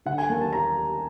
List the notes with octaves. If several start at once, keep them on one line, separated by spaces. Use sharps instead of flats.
D3 F#5
G#5
D#2 A5
A5
A#5